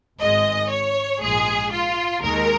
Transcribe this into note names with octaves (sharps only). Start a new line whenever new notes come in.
G#1 G#2 G#3 D#5
C#5
A#1 G#2 G#3 G#4
F4
D#2 D#3 G#3 A#4